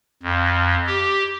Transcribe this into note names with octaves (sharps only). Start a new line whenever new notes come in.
F2
G4